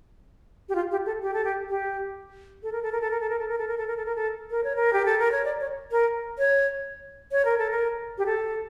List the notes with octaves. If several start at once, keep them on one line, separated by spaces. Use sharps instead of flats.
G4
F4
G4
A4
G4
A4
G4
G4
A4
A#4
A4
A#4
A4
A#4
A4
A#4
A4
A#4
A4
A#4
A4
A#4
A4
A#4
A4
A#4
C#5
A#4
G4
A4
A#4
C#5
D5
C#5
A#4
C#5
C#5
A#4
A4
A#4
G4
A4